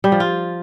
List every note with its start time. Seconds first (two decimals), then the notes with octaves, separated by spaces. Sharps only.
0.04 G3
0.12 F3
0.20 F4